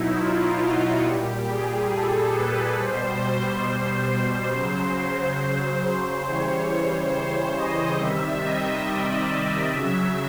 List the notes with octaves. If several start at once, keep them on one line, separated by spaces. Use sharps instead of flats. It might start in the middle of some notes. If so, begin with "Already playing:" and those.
Already playing: B2 F#3 D#4 E4
F4
F#4
A#2 G3 G4
G#4
A4
B4
B2 G3 C5
C#3 F#3
C#3 E3 G3 C#5
C5
C5
D#5
C3 D#3 G3 E5
D#5
D5
C#3 F#3 E5